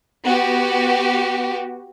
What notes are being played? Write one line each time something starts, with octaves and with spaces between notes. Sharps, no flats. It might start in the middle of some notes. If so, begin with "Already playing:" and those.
B3 F#4 G4